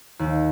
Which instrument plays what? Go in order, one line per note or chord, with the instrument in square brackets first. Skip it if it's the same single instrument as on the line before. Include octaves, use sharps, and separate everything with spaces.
[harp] D#2